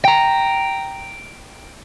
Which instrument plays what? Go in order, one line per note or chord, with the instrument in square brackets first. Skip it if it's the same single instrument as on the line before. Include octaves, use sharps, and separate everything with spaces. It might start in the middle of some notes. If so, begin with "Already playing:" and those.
[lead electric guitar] G5 A#5